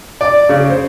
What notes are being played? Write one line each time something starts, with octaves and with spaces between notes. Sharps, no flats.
D5
C#3
C5